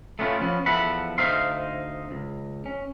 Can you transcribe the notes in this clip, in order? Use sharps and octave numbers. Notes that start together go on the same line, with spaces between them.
A3 B3 C#4 F4
F3 B3 C#4
E2 F3 A4 E5 F#5 B5
D2 D#4 C5 E5 F5 C6
C#2
C#4